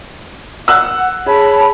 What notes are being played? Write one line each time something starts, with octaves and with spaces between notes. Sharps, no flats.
F#5 E6 F#6
G#4 C#5 A5 B5